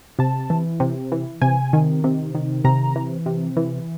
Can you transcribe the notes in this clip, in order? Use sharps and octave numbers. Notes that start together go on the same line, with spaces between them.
C3 A5
E3
C3
E3
C3 G#5
D#3
C3
D#3
C3 A#5
E3
C3
E3